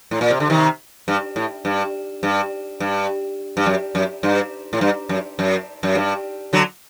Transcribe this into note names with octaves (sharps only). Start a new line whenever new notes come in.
A2
A#2
C3
D3
C3 D#3
G2
A2
G2
G2
G2
G2
F#2
F#2
G2
A2
G2
F#2
F#2
F#2
G2
D3 F#3